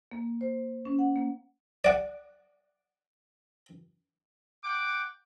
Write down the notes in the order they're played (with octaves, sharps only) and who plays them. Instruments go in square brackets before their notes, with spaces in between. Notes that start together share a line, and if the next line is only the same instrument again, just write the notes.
[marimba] A#3
C5
C#4
F#5
A#3
[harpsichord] D5 F#5
[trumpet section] F#5 G5 D6